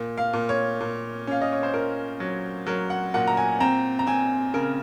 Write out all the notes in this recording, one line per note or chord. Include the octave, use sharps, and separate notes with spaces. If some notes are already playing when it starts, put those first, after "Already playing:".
Already playing: A#2
F5
A#2
C#5
A#2
C#4 F5
D#5
C#5
C5
A#2 A#4
F#3
F#3 A#4
F#5
A#2 F#5
A#5
G#5
C4 A#5
A#5
C4 G#5
C#3 A#4